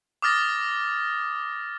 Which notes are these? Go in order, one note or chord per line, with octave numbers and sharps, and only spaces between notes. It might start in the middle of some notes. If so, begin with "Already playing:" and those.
D6 D#6 F6 A6 A#6